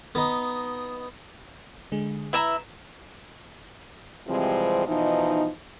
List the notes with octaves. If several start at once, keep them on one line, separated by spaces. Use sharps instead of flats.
B3 D#4
D3 G#3 G#4
E4 B4 E5 A#5
C3 E3 F3 G3 G#3 C4
B2 E3 F3 D#4